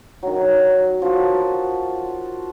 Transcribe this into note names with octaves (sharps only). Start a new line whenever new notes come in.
D#3 F#3
F3 F#4